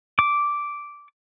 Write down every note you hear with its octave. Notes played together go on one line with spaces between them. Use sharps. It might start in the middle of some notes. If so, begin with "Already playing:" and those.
D6